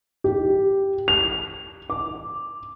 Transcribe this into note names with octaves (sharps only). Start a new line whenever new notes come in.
G4
F7
D6